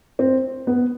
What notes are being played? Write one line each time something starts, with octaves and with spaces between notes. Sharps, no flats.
C4
B3